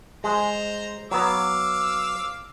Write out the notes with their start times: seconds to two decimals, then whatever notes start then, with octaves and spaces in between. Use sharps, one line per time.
0.24 G#3 C5 A#5
1.11 F#3 B3 F5 D6 E6